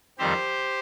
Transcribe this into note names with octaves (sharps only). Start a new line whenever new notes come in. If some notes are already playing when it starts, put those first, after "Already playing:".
F2 D#3 G3 C4 G4 C5